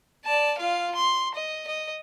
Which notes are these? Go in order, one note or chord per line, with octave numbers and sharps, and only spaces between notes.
D5 A5
F4 F5
C6
D#5
D#5